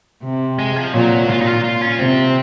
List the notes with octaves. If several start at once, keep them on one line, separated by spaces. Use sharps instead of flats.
C3
G#3
F3
A#2 F#3
A#2 F4
D#4
F4
F4
C#4
C3 C4